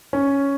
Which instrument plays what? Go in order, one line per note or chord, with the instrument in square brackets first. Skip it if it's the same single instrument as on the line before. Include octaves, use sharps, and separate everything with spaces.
[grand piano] C#4